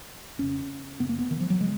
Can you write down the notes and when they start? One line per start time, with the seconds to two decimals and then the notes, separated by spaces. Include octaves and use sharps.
0.38 F2 C#3 C#4
0.99 F#2 C#3 B3
1.09 A#3
1.19 B3
1.31 D#3
1.40 F3
1.50 F#3
1.60 C#3 G#3